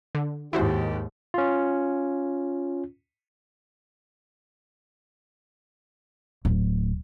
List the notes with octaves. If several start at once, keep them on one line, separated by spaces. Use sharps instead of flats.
D3
D#2 G#2 D#3 E4 F#4 G4 C5
C#4 F4
D1